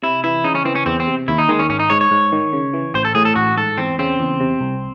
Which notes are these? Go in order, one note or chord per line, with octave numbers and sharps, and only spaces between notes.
C3 E4
E3 E4
C#3 D#4
C#4
E3 C4
C#4
E2 C4
C4
C3
D#2 E4
D#4
D#3 G#3
C#4
G#1 C#4
D#4
G#2 C#5
C#5
G#2
D#3
C#3
E3
A1 C5
A4
A2 G#4
A4
A1 F#4
G#2 A4
E2 C4
C#3 C4
E2
C3
C2